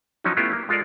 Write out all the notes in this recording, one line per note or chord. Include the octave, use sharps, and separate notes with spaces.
F3 F#3 C#4 D#4
A3 B3 C#4 E4 F4 G4
A#3
G#3 F4 A4 A#4 D5